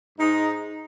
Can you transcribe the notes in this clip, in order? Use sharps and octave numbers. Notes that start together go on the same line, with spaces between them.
G#2 G#3 D#4